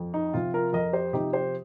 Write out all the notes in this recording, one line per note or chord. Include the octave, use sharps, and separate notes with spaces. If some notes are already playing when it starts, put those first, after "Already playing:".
Already playing: F2
D#4
C3 F3 F4
F4 A#4
F2 A#4 D#5
G4 C5
C3 F3 D#4 G4
G4 C5